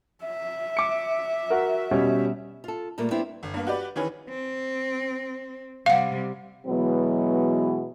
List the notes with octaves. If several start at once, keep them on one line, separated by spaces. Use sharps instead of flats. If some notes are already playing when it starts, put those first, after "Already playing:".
E5
D6 C#7
F#4 A#4
B2 G3 C#4
F4 A4
A#2 G3 A3 A#3
G3 B3 C4 D4 E4
G1
G2 A#3 B3
F#4 G4 B4 D5
D#3 E3 C#4 G#4 B4
C4
C3 G3 F5 F#5
B2 E3 F#3 G#3 B3